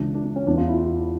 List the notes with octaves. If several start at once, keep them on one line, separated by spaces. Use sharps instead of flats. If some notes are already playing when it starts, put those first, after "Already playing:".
Already playing: C#2 C#3 E3 D4
D4
D4
C#4
E2 E3 D4
F4
E4
F4
E4